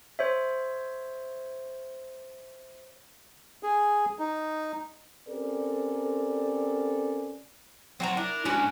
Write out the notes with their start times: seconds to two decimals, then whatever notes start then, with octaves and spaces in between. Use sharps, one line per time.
0.19 C5 C#5 E5
3.63 G#4
4.19 D#4
5.29 C4 C#4 G4 A4 A#4 D5
8.00 F#3 C4 C#5 F#5 A5 A#5
8.17 D4 E4 A#4
8.45 G#2 C#4 D4 E4 F#4